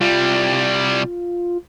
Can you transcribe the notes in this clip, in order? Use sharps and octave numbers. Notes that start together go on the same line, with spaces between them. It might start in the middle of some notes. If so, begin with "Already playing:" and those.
C2 G3 F4